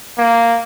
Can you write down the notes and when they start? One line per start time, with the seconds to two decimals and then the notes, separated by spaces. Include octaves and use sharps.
0.18 A#3